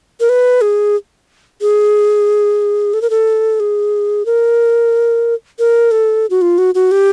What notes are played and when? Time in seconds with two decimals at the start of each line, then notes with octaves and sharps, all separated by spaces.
0.20 A#4
0.29 B4
0.61 G#4
1.61 G#4
2.94 A4
3.02 A#4
3.10 A4
3.60 G#4
4.26 A#4
5.59 A#4
5.91 A4
6.30 F#4
6.42 F4
6.58 F#4
6.75 F#4
6.91 G4